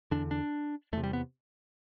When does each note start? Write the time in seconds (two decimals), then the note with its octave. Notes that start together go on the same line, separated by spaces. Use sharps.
0.11 E2 D3 D4
0.31 D4
0.93 E2 A3
0.97 C3
1.04 G3
1.13 B3